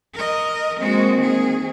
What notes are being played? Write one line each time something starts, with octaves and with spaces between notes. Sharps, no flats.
A#4 D#5
G#3 A#3 C4 F#4
D#3 G#4